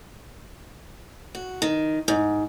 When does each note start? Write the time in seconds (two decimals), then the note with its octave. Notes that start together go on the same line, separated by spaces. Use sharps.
1.35 F#4
1.62 D#3
2.08 G#2